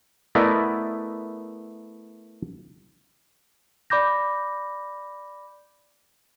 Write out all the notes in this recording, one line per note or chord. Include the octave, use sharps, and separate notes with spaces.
A3 B3 E4 A#4 D5 D#5
D5 B5 D6 G6 A#6